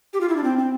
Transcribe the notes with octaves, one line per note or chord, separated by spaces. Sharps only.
G4
F4
E4
D4
C4
C4